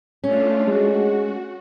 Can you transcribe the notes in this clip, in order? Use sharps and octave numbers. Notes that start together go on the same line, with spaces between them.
A3 C#4 D4 F4
G#3 F#4